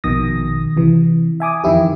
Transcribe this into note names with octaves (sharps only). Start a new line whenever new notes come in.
A#1 B2 D#3 D#6 A#6
C3 E3
E5 G#5 D6 D#6
F2 D#3 E3 E4 G4